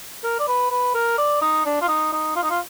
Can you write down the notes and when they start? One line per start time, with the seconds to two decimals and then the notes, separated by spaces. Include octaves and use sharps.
0.24 A#4
0.40 D5
0.48 B4
0.71 B4
0.95 A#4
1.18 D5
1.42 D#4
1.65 D4
1.81 F4
1.88 D#4
2.12 D#4
2.36 F4
2.43 D#4
2.50 F4